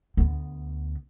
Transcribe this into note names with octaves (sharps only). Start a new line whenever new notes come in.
D2 B3